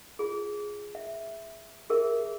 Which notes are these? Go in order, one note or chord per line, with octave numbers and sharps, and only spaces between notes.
F4 G#4
E5
G4 G#4 A#4 E5